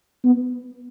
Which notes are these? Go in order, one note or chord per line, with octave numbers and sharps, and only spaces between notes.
B3